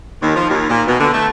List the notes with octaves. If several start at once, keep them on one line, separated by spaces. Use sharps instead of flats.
D#2
F3
D#2
A#2
B2
D3
A3